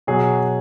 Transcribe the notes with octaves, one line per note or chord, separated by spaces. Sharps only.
B2 F#3 G#4